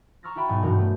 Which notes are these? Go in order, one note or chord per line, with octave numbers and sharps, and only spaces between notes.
A#5 C#6 E6 F6 A6 A#6
E4 F#4 E5 G5 B5
B1 G#2 G#5 F#6
E1 G2 F#4 A#4 G6
A3